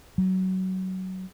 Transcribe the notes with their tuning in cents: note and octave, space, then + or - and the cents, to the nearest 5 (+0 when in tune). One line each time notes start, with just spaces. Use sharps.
F#3 +20